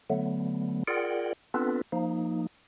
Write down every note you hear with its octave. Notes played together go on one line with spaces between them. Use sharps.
D3 F#3 A3 B3
F4 G#4 A#4 D5 F#5 G5
B3 C4 D4 F4 A4 B4
F3 A#3 D#4